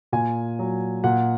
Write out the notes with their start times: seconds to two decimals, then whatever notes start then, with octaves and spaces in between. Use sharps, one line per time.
0.13 A#2 G#5
0.59 F#3
1.04 A#2 F#5